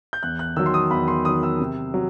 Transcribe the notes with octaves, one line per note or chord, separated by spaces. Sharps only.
G6
E2 F#6
F#6
D#3 F#3 E6
C6
D#6
E2 B5
C6
D#3 F#3 D#6
E6
C3
F#3